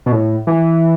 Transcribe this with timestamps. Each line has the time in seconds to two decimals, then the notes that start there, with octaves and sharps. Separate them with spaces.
0.06 B2
0.12 A2
0.47 E3